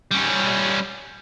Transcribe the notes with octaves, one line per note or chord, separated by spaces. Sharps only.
G3 C#4